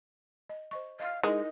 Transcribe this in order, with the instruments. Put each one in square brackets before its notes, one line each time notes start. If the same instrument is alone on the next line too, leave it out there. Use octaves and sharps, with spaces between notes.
[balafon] D#5
C5 D#5 C#6
[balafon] D#5 [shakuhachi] F5
[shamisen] G#3 [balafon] D#4 E4 A#4 [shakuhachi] D#5